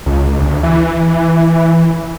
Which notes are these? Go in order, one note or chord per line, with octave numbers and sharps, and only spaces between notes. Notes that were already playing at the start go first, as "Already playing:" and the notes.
C#2
D2
E3